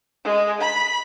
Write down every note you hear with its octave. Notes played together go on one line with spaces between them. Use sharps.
G#3
B5